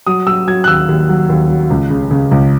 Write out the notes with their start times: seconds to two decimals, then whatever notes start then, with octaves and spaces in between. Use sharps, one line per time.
0.07 F#3 D#6
0.27 F#3 E6
0.47 F#3 G#6
0.64 F#6
0.67 D#2 E6
0.88 D#2
1.09 F#3
1.30 D#2
1.50 F#3
1.70 C#2
1.90 C#3
2.11 C#3
2.31 C#2